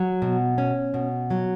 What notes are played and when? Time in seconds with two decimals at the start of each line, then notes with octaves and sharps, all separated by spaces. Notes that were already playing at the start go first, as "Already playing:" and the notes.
Already playing: F#3
0.22 B2
0.58 C#4
0.94 B2
1.31 F#3